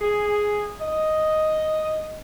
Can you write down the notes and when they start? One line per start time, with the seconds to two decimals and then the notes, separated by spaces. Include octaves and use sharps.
0.01 G#4
0.80 D#5